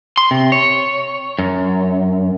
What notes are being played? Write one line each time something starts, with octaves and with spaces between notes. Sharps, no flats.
C6
C3
C#5
F#2